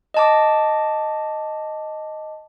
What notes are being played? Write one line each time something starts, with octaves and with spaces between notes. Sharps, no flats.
D#5 A5 D6